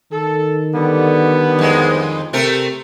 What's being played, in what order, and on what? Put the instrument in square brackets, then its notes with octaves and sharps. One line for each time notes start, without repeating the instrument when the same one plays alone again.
[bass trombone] D#3 [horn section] A4
[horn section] D3 G3 [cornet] B3
[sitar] F2 G#3
[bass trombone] C3 [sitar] A3 C4 A#4